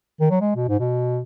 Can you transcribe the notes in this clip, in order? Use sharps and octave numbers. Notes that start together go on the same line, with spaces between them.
D#3
F#3
G#3
B2
G#2
B2